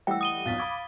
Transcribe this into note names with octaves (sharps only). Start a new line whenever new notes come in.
E3 G3 A3 D#5 F#5 G5 E6
D#6 D#7 G7
B1 F2 B2 F5 A6 B6
B5 D6 G#6